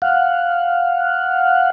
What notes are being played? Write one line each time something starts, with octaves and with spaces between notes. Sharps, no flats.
F5 F#5